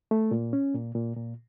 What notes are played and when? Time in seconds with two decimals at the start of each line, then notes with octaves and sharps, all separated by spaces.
0.11 A3
0.31 A#2
0.53 C#4
0.74 A#2
0.95 A#2
1.16 A#2